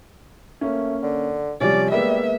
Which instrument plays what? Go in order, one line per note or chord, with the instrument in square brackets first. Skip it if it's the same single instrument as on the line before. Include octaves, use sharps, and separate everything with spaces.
[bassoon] A3 [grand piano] A#3 C#4
[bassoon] D3
[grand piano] C3 F3 G3 [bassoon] C#4 [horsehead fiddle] D5
[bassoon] G3 [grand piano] G#3 A#3 B3 [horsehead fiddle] E5